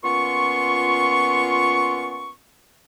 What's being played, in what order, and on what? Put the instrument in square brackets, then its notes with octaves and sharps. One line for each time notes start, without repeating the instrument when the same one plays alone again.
[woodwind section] A#2 B3 C#4 F4 C6 C#6